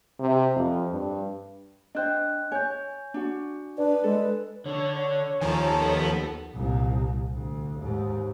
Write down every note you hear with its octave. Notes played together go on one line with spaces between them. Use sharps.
C3
F2
G2
D4 C5 D#5 G5 F#6
C#5 G#5 G6
D4 F#4
D4 B4 D5
G#3 A4
D3 D4 C#5
D#2 D#3 F3 A4 G#5 A#5
B3
C2 A#2
D2
D#2 G#2